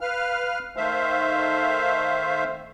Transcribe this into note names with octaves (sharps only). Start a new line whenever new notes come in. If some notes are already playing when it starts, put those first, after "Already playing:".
B4 F5 F6
D#3 A3 C5 E5 F5